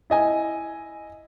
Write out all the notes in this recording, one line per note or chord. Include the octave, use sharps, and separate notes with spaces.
E4 D#5 G#5